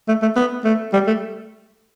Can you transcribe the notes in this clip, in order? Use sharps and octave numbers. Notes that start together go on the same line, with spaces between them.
A3
A3
B3
A3
G3
A3